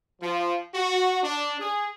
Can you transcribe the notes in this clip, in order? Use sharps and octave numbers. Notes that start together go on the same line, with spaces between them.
F3
F#4
D4
G#4